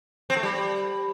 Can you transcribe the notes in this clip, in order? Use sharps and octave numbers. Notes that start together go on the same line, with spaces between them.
C4
A3
G3